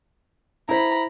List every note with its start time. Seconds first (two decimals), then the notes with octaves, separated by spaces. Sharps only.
0.69 E4 C5 A#5 B5